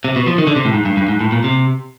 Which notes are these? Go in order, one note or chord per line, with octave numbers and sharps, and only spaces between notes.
C3
B2
F3
D#3
D3
C3
A2
G#2
G2
G2
G#2
A2
A#2
C3